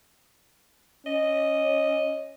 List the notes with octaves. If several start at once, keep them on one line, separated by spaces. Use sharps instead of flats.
C#4 D#5